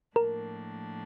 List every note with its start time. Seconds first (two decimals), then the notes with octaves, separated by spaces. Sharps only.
0.16 A2 F3 A#3 D4 A#4